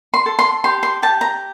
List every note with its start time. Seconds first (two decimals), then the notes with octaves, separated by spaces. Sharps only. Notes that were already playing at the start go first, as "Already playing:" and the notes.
0.14 C6
0.26 A4
0.39 C6
0.64 G4 C6
0.83 C6
1.02 G4 A5
1.21 A#5